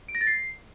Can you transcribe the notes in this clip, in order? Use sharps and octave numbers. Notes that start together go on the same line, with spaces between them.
D7
A#6
A6
C7